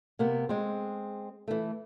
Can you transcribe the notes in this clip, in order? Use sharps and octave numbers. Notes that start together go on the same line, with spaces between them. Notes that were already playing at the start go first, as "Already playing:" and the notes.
C3 A#3 B3
G#3 C4
E3 A3